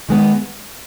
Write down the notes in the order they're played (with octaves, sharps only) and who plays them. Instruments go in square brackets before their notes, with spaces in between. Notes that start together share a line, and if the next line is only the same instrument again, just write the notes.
[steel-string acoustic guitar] D#3 G#3 B3